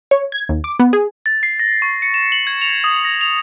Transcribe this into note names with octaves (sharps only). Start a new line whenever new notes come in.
C#5
G#6
D#2
D6
B3
G#4
A6
C7
A#6
C#6
C#7
E7
F#7
G#6
F7
D#6
A#6
F7